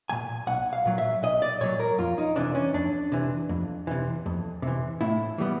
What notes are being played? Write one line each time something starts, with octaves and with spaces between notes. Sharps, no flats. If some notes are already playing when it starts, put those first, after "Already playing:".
A#2 F#3 G#5
B1 F#5
F5
A#2 F#3
E5
B1 D#5
D5
A#2 F#3 C#5
A#4
F2 F4
D#4
C3 E3 D4
C#4
F2 D4
C3 E3
F2
C3 E3
F2
C3 E3
A2 E4
E3 G3 B3